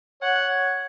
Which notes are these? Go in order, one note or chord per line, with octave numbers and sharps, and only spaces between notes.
C#5 F#5